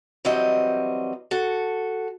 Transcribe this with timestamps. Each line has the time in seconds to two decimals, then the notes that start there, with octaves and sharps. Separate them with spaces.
0.25 E3 F#3 G3 C4 D#5
1.31 F#4 A4